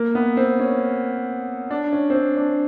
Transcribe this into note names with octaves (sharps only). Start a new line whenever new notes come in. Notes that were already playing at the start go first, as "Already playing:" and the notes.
Already playing: A#3
B3
C4
C#4
D4
C#4
C4
C#4
D4